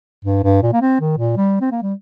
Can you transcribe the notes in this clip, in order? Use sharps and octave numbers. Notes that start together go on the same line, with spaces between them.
G2
G2
A#2
A#3
C4
D#3
A#2
G3
C4
A#3
G3